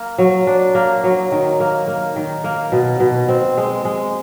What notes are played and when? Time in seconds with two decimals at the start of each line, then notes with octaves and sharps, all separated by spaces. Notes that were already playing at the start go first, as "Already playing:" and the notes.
Already playing: A#3
0.18 F#3
0.47 D4
0.75 A#3
1.04 F#3
1.32 D#3
1.60 A#3
1.87 A#3
2.16 D#3
2.44 A#3
2.72 B2
3.00 B2
3.28 C4
3.57 G#3
3.85 G#3